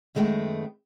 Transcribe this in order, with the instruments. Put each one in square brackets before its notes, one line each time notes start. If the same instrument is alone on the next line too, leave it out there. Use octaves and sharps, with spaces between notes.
[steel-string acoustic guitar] F#2 D#3 G#3 A3 B3 G5